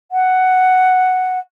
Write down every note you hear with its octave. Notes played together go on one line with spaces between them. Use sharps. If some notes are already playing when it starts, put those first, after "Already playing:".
F#5